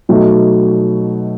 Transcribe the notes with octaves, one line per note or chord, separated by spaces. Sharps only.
B2 F#3 A3 D#4